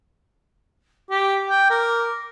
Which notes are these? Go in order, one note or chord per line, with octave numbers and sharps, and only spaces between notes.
G4 D6
G5
A#4